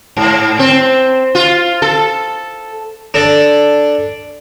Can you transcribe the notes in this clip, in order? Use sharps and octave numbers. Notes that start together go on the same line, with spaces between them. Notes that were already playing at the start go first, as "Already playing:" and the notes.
G#2
C4
F4
A4
D4 A4 D5